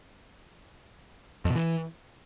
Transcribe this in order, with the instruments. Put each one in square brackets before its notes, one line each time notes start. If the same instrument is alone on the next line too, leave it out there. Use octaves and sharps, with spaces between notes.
[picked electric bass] F2
B2
E3